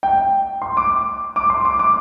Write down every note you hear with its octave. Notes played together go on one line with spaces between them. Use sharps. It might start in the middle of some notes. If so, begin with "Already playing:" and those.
G5
C6
D6
D6
C6
D6
D6